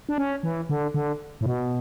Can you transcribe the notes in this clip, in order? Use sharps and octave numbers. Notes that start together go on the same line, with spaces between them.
D4
C#4
E3
D3
D3
A2
B2